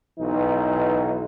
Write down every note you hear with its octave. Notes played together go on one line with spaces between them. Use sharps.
B1 E3 D#4